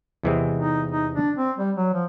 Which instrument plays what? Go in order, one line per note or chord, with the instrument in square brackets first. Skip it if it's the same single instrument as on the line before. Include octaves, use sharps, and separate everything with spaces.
[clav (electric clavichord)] E2 C3 E3 G#3 C4
[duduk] D#4
D#4
D4
C4
G3
F#3
F3